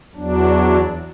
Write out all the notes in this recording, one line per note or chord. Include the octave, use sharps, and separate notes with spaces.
E2 F#3 D4